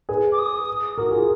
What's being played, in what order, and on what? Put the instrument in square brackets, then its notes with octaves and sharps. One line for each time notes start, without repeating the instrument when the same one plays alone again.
[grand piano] G#4 B4
[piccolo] D6
D#6
[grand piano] F#4 A#4
F4 G#4